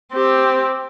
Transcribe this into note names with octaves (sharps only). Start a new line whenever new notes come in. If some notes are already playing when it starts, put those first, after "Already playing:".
C4 G4